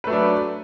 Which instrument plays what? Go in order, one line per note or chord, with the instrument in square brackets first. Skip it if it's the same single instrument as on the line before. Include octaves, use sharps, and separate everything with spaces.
[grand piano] B4
A3
F#3
D4